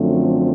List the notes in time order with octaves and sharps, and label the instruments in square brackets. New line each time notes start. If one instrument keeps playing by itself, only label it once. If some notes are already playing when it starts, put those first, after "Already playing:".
Already playing: [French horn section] F#2 D3 F3 A3 C4